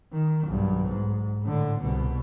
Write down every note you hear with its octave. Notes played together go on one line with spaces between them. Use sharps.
D#3
B1 G2
G#2
A2 D3
C2 B2